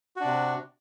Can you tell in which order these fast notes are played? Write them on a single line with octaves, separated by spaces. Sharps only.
F#4 D4 C3